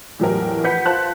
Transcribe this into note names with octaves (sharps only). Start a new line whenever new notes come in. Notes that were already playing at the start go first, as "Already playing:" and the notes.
E2 A2 F#3 E4 G4 A#4
F3 B4 F#5 G6 B6 C#7
F4 C5 A5 F#6